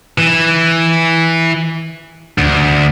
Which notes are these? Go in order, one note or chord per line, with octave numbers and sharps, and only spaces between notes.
E3
D2